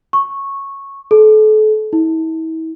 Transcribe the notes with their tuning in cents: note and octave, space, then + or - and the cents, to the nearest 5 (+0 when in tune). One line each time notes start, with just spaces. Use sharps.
C#6 -10
A4 -35
E4 -40